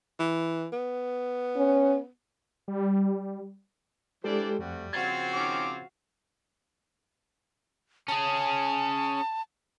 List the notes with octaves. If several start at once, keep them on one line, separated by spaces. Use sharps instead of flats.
E3
B3
C#4
G3
E3 G3 G#3 D4 G4 A4 C5 D5
F2 G3 A3 C4 F#4
C#3 F3 C4 F#4 F5 G#6 A6
D#3 C#4 D6
C#4 G#4 A5